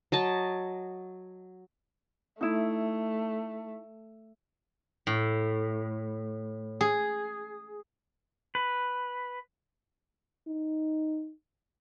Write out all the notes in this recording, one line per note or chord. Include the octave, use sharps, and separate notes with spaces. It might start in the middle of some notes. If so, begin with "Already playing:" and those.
F#3 D#5 A5
A3 D#4 E4
A2
G#4
B4
D#4